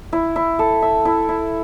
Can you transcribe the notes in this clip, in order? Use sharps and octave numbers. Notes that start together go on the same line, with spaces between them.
E4
E4
A4
E5
E4
E4